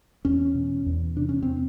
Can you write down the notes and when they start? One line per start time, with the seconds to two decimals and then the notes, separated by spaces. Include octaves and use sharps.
0.25 E2 C#4
0.55 B2
0.86 E2
1.16 C3 D4
1.29 C#4
1.43 C4